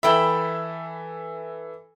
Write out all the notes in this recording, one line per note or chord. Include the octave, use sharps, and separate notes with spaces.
E3 E4 A4 E5 G5 B5